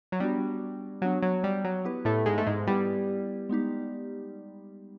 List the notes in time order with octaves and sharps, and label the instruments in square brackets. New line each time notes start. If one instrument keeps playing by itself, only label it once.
[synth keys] F#3
[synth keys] G3 [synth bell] B3 D4 F#4
[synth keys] F#3 [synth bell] B3 D4 F#4
[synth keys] F#3
G3
F#3
[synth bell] B3 E4 G4 B4
[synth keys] A2 A3
G#2 G#3
A3
G#2 G#3
[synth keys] G3 [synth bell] B3 E4 G4 B4
[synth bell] G#3 B3 D#4 G4